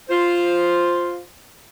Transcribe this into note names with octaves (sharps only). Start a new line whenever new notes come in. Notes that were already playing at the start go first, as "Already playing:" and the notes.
F4 C5